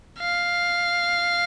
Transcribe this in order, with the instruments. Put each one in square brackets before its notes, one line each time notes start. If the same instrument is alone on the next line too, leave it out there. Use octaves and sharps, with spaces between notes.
[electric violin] F5